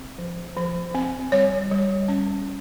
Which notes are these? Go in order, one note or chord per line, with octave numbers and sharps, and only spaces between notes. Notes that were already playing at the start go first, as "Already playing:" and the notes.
Already playing: C4
F3
F3
C4
G3 C#5
G3
C#4